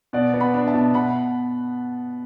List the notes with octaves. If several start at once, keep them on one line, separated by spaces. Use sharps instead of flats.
B2 D5 F#5
B3
F#5 B5
D4
E5 A5
B2
B2 F#5 B5